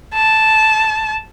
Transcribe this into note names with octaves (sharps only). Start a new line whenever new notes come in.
A5